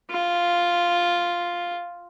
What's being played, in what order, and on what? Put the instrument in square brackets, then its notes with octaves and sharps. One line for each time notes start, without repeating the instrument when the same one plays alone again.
[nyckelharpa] F4